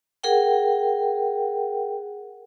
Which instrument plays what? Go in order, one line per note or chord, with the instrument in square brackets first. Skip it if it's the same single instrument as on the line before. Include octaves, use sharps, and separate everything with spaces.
[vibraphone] G#4 A#4 F#5 G5